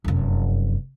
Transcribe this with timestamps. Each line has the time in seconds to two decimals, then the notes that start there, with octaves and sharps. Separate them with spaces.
0.04 F1 F#2